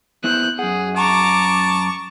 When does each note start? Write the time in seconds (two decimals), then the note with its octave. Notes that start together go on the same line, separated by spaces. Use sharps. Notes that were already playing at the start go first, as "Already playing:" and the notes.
0.24 B3 E4 C5 F#6 G6
0.59 F#2 G#4 F#5
0.97 A5 A#5 C#6 D6